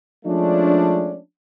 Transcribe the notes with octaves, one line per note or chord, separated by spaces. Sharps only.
F3 G#3 A3 C#4 D4